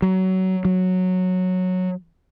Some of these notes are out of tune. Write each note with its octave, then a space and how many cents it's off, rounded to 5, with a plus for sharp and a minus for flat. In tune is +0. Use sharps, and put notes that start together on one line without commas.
F#3 +20
F#3 -10